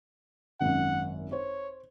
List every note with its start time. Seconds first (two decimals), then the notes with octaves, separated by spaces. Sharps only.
0.61 G#1 F#2 F#5
1.32 C5 C#5